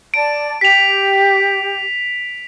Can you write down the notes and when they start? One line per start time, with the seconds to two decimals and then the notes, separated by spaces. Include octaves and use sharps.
0.14 D5 A5 D7
0.61 G4 B6 F7